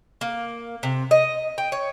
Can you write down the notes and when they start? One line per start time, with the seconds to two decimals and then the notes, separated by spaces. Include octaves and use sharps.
0.21 A#3
0.83 C3
1.11 D#5
1.58 G5
1.72 C#5